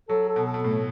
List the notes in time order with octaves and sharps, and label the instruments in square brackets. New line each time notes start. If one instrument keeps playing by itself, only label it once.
[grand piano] F#3 [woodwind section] A4
[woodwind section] A4
[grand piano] B2
[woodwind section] A4
[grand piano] B2
[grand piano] A2 [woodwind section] A3